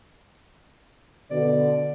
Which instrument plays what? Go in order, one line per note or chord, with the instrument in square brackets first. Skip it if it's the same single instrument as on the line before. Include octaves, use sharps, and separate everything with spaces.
[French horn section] B2 D3 [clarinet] D5